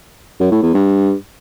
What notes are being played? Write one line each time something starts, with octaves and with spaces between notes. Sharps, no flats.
F#2
A2
E2
G2